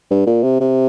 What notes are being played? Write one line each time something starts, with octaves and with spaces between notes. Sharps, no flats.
G2
A#2
C3
C3